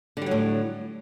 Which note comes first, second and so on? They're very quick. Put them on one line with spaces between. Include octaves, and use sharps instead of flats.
D3 G3 F#3 A2